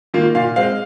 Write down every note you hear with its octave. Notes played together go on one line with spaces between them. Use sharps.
D#3 A#3 F4
A#2 F5
G#3 C4 F5